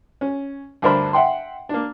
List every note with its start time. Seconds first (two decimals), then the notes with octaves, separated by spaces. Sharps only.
0.21 C#4
0.82 D2 G2 D4 A#4 C5 B5
1.13 E5 F#5 G5 C6
1.69 A#3 D4